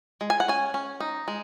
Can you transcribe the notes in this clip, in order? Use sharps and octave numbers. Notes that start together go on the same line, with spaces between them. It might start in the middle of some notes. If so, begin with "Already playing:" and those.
G#3
G#5
F#5
C#4 G#5
C#4
D#4
G#3